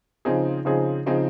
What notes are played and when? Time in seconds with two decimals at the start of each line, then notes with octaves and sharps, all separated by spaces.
0.25 C#3 F3 C4 D#4 G#4
0.65 C#3 F3 C4 D#4 G#4
1.06 C#3 F3 C4 D#4 G#4